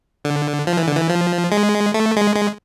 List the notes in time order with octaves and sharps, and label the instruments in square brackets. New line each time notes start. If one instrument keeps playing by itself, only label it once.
[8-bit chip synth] D3
F3
E3
D3
E3
F3
G#3
A3
G#3
G#3